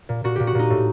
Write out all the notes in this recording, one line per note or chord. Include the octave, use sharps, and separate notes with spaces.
A#2
A#2 F#4
A#2 G4
F#4
A#2 D#4
A2